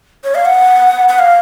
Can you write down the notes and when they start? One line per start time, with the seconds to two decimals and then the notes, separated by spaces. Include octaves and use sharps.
0.24 C#5
0.35 F5
0.45 F#5
1.09 F#5
1.19 F5